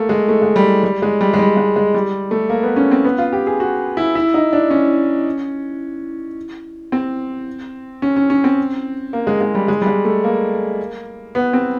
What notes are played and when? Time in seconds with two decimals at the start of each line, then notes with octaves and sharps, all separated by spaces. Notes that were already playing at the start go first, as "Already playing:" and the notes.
Already playing: A3 A#3
0.09 G#3
0.29 A3
0.42 G#3
0.56 G3
0.84 G3
1.02 G#3
1.21 G3
1.34 G#3
1.39 G3
1.57 G#3
1.76 G#3
1.94 G3
2.31 A3
2.50 A#3
2.63 B3
2.76 C#4
2.91 C4
3.04 B3
3.18 F4
3.33 G4
3.47 G#4
3.60 F#4
3.97 E4
4.15 E4
4.34 D#4
4.53 D4
4.70 C#4
6.92 C4
8.02 C#4
8.16 C#4
8.30 C#4
8.44 C4
9.13 A#3
9.27 G#3
9.41 G#3
9.55 G3
9.68 G#3
9.81 G3
9.87 G#3
10.05 A3
10.24 A#3
11.35 B3
11.53 C4